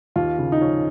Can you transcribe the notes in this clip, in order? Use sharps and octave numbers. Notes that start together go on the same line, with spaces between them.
D#2 F4
C#3
D#4
F3 C#4